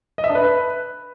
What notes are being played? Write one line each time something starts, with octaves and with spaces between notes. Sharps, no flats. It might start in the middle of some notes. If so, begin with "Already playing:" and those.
D#5
E5
D4
B4